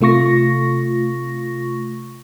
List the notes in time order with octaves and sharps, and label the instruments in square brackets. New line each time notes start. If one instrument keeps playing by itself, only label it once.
[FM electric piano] C3 A3 F4 C#6 A#6